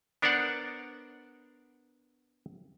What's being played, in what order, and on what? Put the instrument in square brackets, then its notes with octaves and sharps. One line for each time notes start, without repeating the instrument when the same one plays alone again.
[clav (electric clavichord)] B3 D4 A#4 C5 D5 F#5